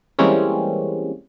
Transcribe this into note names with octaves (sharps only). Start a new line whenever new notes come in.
E3 G3 G#3 A#3 C4 C#4